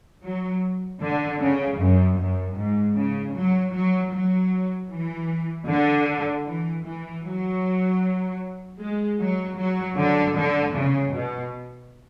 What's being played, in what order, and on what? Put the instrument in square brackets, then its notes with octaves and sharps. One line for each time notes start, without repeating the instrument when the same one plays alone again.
[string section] F#3
D3
C#3
F#2
F#2
G#2
C#3
F#3
F#3
F#3
E3
D3
E3
E3
F#3
G#3
F#3
F#3
D3
D3
C#3
B2